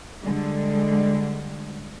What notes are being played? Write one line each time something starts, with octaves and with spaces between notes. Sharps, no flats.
D3 G3 G#3